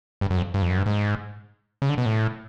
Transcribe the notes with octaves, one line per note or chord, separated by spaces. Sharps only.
G2
F#2
F2
G2
F2
F#2
G2
G#2
C#3
D3
B2
A2